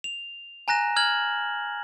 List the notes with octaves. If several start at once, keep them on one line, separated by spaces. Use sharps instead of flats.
F7
G#5 A#5 F#6 A#6 E7
F6 G#6 F#7